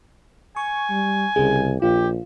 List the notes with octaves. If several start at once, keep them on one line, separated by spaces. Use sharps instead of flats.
G#5 C#6
G3
C2 C#3 G#4
A#1 F4 G4